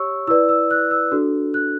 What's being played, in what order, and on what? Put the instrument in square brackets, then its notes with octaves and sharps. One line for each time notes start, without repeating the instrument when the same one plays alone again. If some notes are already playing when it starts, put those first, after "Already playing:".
Already playing: [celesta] G4 C#5 C#6 E6
E4 E6
B4 D5
E6
F#6
E6
D4 F#4 A4
F#6